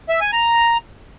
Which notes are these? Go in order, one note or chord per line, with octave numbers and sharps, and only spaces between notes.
E5
G#5
A#5